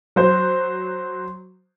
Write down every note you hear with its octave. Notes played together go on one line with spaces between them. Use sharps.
F#3 C5